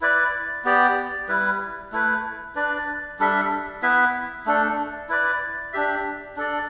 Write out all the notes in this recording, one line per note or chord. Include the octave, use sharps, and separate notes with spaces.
E4 B4 D5
B3 G4 D5
G3 E4 B4
A3 E4 B4
D4 B4 D5
G3 D4 A4 E5
B3 E4 B4 E5
A3 D4 A4
E4 B4 D5
D4 G4 E5
D4 A4 D5